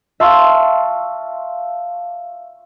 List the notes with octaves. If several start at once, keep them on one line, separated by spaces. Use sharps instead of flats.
E5 F5 A5 C6 C#6